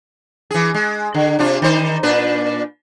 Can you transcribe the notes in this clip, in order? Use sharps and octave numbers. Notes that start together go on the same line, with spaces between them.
E3 G#4
G#3
D3
C3 D4 F4
D#3 D#4 C5
A#2 D4 B4